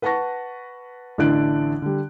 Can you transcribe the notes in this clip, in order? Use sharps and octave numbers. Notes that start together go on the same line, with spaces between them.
B4 F#5 A5 C#6 A#6
A1 D3 E3 D4 F#6 D7
D3 G3